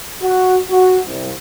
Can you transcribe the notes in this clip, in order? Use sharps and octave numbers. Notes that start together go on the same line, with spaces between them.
F#4
F#4
C2